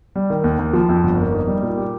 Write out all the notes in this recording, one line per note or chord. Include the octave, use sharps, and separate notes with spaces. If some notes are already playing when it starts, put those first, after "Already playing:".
G3
D#3
D#2
D#2
F3
F2
G1
A#3
D#4
G3
A#2
G4